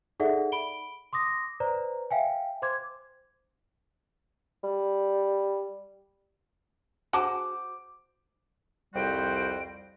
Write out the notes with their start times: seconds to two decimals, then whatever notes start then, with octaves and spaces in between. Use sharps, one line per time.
0.20 D#4 G#4 A4 D5 E5 F#5
0.52 B5 D7 G7
1.13 C6 D6 D#6 A#6
1.60 B4 C5 D5 A#5
2.11 E5 F5 G5 G#5
2.62 C5 C6 D6 G#6
4.64 G3
7.13 F#4 G#4 C5 A5 D6
8.94 C2 F2 G3 F#4 C5 G5